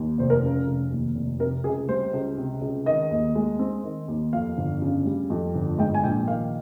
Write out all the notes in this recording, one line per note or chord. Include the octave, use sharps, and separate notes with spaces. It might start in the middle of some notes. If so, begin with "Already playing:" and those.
Already playing: D#2
F1 C5
A#4
C#3
F1
D#2
F1
C3 A#4
C#2 G#4
G3 C5
C#2
C3
C#2
D#3 D#5
D#2
G#3
C4
D#3
D#2
F2 F5
G1
C#3
G3
F2
G1
G#2 G5
G#5
A#1 G5
D#3 F5